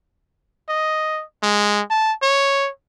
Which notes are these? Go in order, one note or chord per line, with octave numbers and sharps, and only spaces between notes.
D#5
G#3
A5
C#5